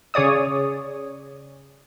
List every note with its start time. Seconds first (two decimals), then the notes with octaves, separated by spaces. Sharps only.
0.14 C#3 G#4 C#5 D5 D#6